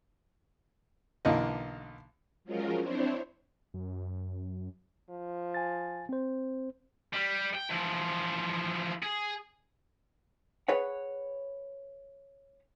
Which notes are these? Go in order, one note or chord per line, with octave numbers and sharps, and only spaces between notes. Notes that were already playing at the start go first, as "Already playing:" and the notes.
B1 D3 E3 A#3 D#5
F3 F#3 G#3 C#4 F4 A#4
C4 D4 E4 C5 C#5
F#2
F3
G#5 A6
C4 C5
G3
G5
E3 F3
G#4
G#4 B4 C#5 F#5